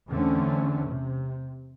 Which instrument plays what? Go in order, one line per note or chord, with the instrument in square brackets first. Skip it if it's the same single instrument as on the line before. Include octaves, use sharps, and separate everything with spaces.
[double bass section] E2 D3 A3 C4 C#4
C3